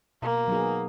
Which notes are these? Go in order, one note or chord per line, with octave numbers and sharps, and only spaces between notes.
B2 A#3
F#3 B3 D#4 G#4